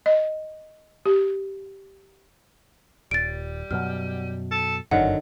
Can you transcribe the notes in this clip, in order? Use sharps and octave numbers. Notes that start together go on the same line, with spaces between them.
D#5
G4
D#1 G3 A6 D7
F#2 B2 F#3 F6
A4
G1 F#2 D3 D#3 F#3 F#5